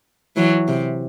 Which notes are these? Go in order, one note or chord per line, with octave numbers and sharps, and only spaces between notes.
E3 F#3
C3